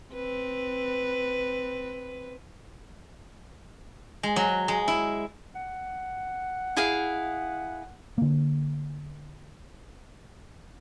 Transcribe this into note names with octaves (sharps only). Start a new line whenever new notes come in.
C4 B4
G#3
F#3
G#3
E4
F#5
E4 G#4 F5
D3 A#3